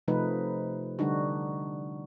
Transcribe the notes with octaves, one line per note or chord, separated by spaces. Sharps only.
C3 F3 A3 D#4 B4
D3 G3 D4 D#4 F#4